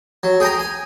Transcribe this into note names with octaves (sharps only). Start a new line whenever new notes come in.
F#3
G#4 G5 G#5 A#5
G#5